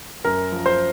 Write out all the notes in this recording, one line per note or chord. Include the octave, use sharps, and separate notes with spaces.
F#2 A#4
F3
C5